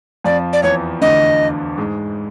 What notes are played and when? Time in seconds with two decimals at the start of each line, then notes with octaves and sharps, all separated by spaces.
0.24 F2 F3 D5
0.53 D5
0.63 E2 E3 C#5
1.01 D2 D3 D#5
1.77 G#2 G#3